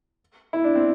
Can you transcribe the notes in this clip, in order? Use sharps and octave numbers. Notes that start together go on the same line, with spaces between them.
E4
D4
C4